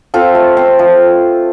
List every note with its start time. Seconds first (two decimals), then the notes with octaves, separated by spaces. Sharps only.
0.14 C4 F4 A4
0.35 A3
0.57 C4
0.79 F3